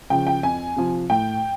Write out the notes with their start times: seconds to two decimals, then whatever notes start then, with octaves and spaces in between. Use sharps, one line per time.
0.10 C#3 F3 G5
0.27 G5
0.43 F2 G#5
0.76 C3 F3
1.10 A2 G5